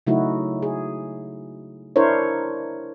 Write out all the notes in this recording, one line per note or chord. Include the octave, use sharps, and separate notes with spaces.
C#3 F#3 A3 D#4 E4 F#4
G#4
D4 E4 A#4 C5 C#5